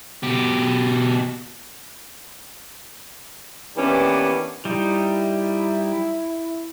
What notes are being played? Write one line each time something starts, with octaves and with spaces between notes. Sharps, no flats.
B2 G4
E3 A#3 B3 C#4 D4 G4
G3 D#4 E4